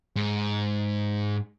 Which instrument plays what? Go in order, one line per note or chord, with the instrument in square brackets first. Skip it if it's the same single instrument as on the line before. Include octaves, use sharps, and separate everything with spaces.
[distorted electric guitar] G#2